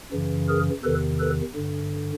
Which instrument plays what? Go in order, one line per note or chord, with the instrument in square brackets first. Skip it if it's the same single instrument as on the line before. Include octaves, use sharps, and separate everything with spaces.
[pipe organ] F#2 C#3 E3
G#4 A#4
E2 C3 D#3 A4 B4
A4 B4
G2 D3